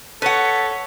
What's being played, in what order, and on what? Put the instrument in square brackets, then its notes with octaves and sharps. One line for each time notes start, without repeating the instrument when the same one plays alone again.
[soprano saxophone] A4 [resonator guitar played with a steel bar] B4 F#5 [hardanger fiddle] C#5 [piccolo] B6